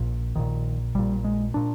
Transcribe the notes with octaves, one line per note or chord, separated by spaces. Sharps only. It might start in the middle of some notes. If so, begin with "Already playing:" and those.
Already playing: A#1 A#2
A#1 A#2 D#3
A#1 A#2 G3
G#3
A#2 D4